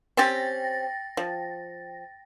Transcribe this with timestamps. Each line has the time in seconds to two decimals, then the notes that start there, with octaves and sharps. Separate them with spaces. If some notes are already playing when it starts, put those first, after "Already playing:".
0.17 C4 C#4 G4 G5 A6 A#6
1.17 F3